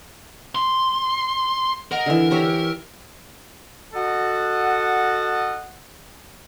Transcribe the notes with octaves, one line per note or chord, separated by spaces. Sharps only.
C6
A#4 D#5 F#5
D3 E3
G4 C#5 E5
F#4 A4 D#5 F#5